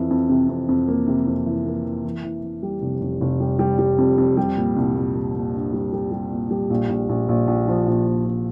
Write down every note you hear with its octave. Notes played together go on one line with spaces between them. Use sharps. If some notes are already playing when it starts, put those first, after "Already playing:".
Already playing: F2 E3
F2
C3
F2
F2
A#3
C3
F2
E3
A#3
E3
E3
E3
E3
G3
F1
F1
F1
G3
G3
G3
F2
F2
G3
A#2
C2
A#2
G3
A#2
D4
G3
G3
G3
A#2
G3
A#1
A#1
A#1
A#1
A#1
F3
A#1
A#1
F3